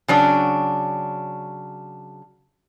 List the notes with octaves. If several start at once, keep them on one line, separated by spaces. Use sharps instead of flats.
C#3 F#3 D4